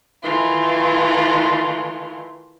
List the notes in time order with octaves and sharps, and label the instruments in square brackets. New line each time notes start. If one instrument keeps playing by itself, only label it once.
[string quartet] D#3 E3 A3 F4